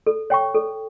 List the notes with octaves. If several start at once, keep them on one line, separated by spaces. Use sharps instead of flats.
A4
C#5 G5 C#6
A4